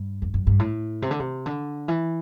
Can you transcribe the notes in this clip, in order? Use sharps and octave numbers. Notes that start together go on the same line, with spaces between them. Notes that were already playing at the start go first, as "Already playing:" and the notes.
Already playing: G2
E2
F#2
G2
A2
C3
D3
C3
D3
E3